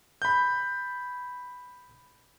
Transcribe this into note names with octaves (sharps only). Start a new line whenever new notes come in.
B5 G6